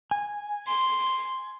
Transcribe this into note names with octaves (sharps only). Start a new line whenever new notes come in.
G#5
C6